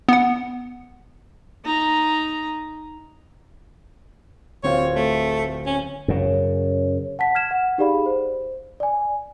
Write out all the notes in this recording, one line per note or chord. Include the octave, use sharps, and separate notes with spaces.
B3 F#5
D#4 A#5
D1 C4 F4 C#5
A3
C#4
F#2 C#3
F#5 A5 B6
F6 G#6 E7
F#5
D#4 G4 G#4 D5 F5 B5
C5
D5 G#5